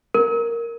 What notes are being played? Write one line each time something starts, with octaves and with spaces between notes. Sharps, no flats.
A#4